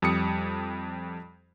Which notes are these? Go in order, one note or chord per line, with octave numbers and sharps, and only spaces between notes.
F2 G3 D#6 C#7